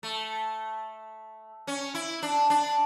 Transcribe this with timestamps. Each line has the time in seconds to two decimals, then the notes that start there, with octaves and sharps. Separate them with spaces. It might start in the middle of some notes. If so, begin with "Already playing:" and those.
0.03 A3
1.67 C#4
1.94 E4
2.23 D4
2.50 D4